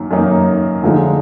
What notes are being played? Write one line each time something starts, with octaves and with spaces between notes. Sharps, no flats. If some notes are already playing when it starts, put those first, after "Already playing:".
Already playing: F#2 D#3 A#3
F#2 D#3 A#3 D#4
D3 F3 G#3 D#4